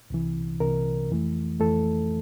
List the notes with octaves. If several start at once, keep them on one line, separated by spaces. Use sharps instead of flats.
C2 C3 E3
C2 C3 E3 A#4
F2 E3 A3
F2 E3 A3 A4